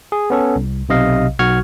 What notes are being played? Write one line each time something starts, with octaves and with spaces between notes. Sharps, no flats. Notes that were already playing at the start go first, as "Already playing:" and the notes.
G#4
B3 C#4 A4
C2
B1 C3 D#5 F5
B1 F#4 C#6 F6 G#6